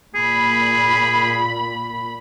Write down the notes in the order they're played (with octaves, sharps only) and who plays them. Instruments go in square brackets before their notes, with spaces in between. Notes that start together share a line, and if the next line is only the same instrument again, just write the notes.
[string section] A#2 B5 [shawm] G#4